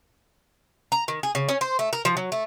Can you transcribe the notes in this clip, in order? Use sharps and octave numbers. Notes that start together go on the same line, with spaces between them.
A#5
D#3
G#4
C#3
C#4
C5
A3
A#4
F3
F#3
A3